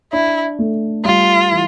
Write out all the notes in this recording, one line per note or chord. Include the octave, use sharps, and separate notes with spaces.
D4 E4
A3
G3 F4
E3